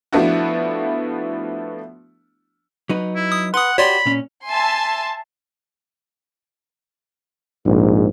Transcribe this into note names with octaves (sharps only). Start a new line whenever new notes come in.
F3 A3 B3 D4 E4 F#4
F#3 D#4 B4
E4
D#6
B4 F#5 C6 D#6
F#4 G4 C#5 D5 B5 C6
A#2 C#4
E5 G#5 A5 C6
A#1 G#2